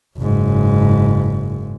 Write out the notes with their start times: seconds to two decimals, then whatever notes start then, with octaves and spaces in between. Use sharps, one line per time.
0.18 F#1 G#2